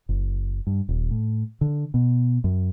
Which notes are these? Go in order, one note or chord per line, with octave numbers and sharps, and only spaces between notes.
F#1
G2
D#1
A2
D3
B2
F#2